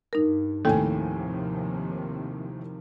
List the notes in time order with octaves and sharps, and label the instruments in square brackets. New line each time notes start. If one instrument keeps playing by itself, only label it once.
[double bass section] G2 [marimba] D#4 A#4
[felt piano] D#2 A2 G#5 [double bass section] C3 D#3 F3 [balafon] A4 G5